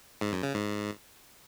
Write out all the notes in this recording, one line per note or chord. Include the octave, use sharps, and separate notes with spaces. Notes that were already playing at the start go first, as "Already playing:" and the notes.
G#2
F#2
C#3
G#2